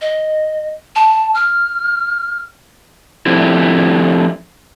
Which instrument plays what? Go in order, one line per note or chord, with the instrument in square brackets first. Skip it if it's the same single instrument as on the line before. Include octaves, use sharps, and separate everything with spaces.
[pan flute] D#5
A5
F6
[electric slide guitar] F3 A3 C4 D4 E4 G4